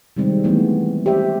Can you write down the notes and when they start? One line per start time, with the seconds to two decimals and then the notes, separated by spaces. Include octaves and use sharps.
0.17 C3 D#3 G3 G#3 C4
0.44 E3 G#3 A3 B3
1.06 G4 C5 E5